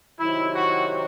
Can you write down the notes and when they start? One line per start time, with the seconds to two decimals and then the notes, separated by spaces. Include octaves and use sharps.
0.19 C3 D#3 F#3 E4
0.54 F#4